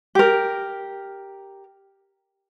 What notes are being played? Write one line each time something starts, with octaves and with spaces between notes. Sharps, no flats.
G4 A#4